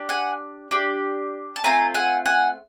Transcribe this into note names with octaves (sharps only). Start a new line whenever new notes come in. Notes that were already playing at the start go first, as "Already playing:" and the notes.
Already playing: D4 G4
F#5 G#5
D4 G4
A5
A3 C4 F4 G#5 A#5
F#5 G#5
F#5 G#5